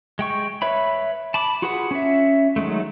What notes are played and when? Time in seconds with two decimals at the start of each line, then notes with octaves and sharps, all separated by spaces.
0.19 G#3 G5 C#6
0.62 B4 C#5 E5 B5
1.34 A5 B5 D6
1.62 F4 F#4 G#4 B4 F#5
1.91 C#4 E5
2.56 D#3 F#3 G#3 A3